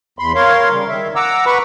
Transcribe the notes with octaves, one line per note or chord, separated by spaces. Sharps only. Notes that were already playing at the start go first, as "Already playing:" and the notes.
E2 B5 C6
A#4 C#5 F5 C6
C#3 G3
D#3 E5
F#5 A#5 D6 E6
B4 F#5 B5 C#6